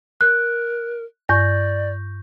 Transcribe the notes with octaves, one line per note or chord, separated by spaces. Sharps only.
A#4 F#6
G2 D5 C#6 G6 A#6